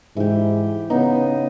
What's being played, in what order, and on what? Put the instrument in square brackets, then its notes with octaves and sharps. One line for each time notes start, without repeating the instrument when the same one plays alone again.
[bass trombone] G#2 [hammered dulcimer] E3 G4
[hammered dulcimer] C#3 D#4 [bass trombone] B3